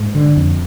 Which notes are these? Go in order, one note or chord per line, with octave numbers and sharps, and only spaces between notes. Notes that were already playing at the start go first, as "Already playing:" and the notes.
Already playing: G#2
D3
F2